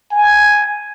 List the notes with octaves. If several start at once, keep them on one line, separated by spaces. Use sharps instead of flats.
G#5